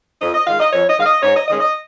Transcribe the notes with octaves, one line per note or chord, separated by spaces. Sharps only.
F2 D#5
D#5
D#3 G#3 F5
D#5
F2 C#5
D#5
D#3 G#3 F5
D#5
G#2 C#5
D#5
D#3 G#3 C#4 D#5
D#5